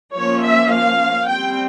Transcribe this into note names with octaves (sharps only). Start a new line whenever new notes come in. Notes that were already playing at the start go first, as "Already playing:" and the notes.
F3 A#3 C#4 C#5
E5
F5
G3 C4 G5